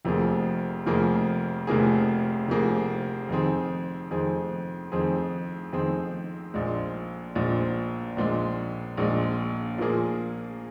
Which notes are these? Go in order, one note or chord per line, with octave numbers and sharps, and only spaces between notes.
F1 F2 F3 A#3 G#4
F1 F2 F3 A#3 G#4
F1 F2 F3 A#3 G#4
F1 F2 F3 A#3 G#4
F2 D#3 C4 G#4
F2 D#3 C4 G#4
F2 D#3 C4 G#4
F2 D#3 C4 G#4
A#1 A#2 G#3
A#1 A#2 G#3
A#1 A#2 G#3
A#1 A#2 G#3
A#2 F3 A#3 G#4